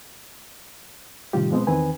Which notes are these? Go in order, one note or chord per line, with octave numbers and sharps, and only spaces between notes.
A2 C3 D#3 G3 F4 G4
B2 F3 G#3 B3 C4
E2 D#3 C4 B4 G#5